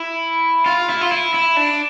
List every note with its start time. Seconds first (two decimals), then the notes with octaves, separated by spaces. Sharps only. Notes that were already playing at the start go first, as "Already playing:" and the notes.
Already playing: E4
0.66 F4
0.89 E4
1.01 F4
1.12 E4
1.34 E4
1.57 D4